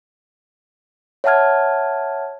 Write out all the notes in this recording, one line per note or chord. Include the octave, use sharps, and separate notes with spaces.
C#5 E5 F#5 A5 F6 G#6